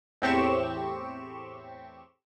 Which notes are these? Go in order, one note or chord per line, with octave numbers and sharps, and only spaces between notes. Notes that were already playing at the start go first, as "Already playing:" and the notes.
E2 A2 C4 G4 C#6 E7